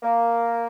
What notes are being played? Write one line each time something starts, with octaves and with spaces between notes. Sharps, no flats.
A#3